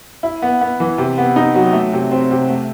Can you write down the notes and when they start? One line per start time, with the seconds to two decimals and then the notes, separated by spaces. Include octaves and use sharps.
0.23 E4
0.42 B3
0.61 B3
0.80 E3
0.98 C3
1.18 B3
1.36 D#4
1.55 F#3
1.73 A3
1.93 C3
2.11 C4
2.31 C3
2.49 A3